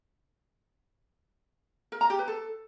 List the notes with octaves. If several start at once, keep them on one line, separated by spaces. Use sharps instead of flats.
A#4
A#5
G4
B4
A4